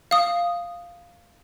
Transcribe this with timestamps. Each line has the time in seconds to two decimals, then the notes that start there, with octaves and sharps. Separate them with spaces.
0.11 F5 D#6